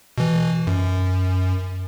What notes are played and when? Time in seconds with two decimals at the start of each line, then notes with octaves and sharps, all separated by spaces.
0.18 B2 E3
0.67 F#2